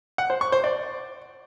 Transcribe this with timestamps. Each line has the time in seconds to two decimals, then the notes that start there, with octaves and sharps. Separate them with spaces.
0.18 F#5
0.30 C5
0.41 C#6
0.52 C5
0.64 D5